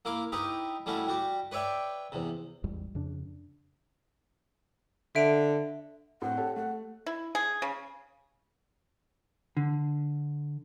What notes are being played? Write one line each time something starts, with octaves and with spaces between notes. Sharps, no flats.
A#3 E4 F5 D6
D#4 E4 G4 B4
G3 A3 C#4 E4 F#4
G3 F#4 G4
B4 C#5 D5 E5 G5
E2 C3
A1 E2 G#2 G3
F2 C#3 D4
D3 E5 D7
A2 C4 F#5
G4 A4 C#5
A3 F#5
E4
G#4
C#3
D3